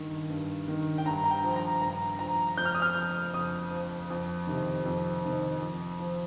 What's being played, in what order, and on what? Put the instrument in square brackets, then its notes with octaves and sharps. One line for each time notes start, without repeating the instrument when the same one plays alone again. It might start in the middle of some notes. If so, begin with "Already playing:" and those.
Already playing: [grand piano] G2 D#3
G2
D#3
G5
G2 A#5
A#5
G5
F3
A#5
G2 A#5
F3 A#5
F2 G6
F6
D#6
F6
F3
F2 D#6
F3
F2
C3 D#3
F2
C3 D#3
F2
F3